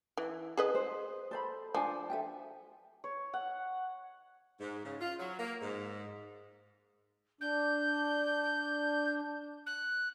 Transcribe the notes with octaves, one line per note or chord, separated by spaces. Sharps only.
E3
G#4 B4 D#5
C5
A4 C5 B5
F3 D4 G#5
A4 E5 G5
C#5
F#5
G#2
C#3
F4
F#3
A#3
G#2
D4 G6
F#6